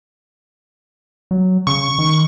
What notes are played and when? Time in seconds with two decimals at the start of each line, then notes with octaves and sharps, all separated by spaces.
1.31 F#3
1.67 C#3 C#6
1.98 D#3